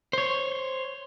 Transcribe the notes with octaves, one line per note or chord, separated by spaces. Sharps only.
C5 C#5